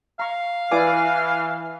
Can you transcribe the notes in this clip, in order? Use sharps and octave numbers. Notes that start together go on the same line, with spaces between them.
F5 A#5 C#6
E3 E4 B4 D5 G#5 D6